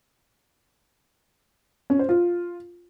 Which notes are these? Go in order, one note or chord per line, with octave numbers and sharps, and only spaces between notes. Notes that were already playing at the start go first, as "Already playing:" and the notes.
C#4
C5
F4